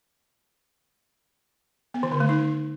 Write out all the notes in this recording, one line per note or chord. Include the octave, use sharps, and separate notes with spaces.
B3
D#3
D3
A3
D#4